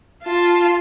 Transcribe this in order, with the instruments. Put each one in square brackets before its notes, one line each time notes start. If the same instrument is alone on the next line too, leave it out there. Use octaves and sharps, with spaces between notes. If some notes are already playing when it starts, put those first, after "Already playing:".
[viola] F4 A5